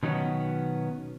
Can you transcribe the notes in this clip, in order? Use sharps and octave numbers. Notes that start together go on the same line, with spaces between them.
B2 D#3 F#3 B3 C#4